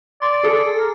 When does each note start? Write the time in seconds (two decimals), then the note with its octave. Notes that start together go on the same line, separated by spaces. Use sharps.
0.22 D5 C6 A6
0.43 G#4 A4
0.79 A#4